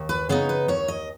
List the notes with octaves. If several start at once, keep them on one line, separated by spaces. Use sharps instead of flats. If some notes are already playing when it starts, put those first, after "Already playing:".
Already playing: D#2
B4
C#3 B3 D#4 C#5
B4
D#2 C#5
D#5